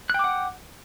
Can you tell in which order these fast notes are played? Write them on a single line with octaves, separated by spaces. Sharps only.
F#6 G5 D6 F#5